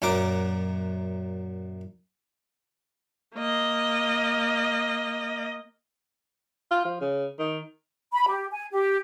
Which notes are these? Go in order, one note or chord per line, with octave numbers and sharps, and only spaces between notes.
F#2 A#2 F#3 A#4 D6
A#3 D#5
F4
F3
C#3
D#3
B5
G4
G#5
G4